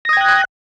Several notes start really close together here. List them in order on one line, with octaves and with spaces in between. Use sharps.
A#6 D#6 G#6 G5 F#6